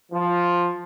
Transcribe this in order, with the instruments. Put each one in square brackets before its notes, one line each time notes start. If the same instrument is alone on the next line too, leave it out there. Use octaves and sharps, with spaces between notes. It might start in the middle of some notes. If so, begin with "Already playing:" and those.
[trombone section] F3